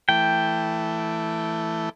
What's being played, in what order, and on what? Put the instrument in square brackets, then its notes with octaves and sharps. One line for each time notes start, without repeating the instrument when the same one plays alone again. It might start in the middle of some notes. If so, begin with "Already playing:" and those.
[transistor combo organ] E3 A3 [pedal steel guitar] G5